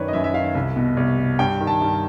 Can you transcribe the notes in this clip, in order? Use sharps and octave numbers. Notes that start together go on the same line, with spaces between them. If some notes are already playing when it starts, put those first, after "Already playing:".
Already playing: F#2 D#3 B4 C#5 D5
D#5
F#2 E5
E5
D#3 F5
C2
B2
C2
B2
G2 G5
D#3
A5
G2